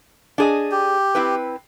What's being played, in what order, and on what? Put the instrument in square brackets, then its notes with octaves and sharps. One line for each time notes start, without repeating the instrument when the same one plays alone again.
[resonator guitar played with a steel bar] D4 G#4 D#5
[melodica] G4
[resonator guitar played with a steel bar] C4 E4 B4